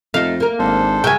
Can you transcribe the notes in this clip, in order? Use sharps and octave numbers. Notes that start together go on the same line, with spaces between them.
F2 A3 D#4 F5
A#3 A#4
G#1 D4 A4 C5
G2 C#3 G#3 F#4 A#4 E5 G5 G#5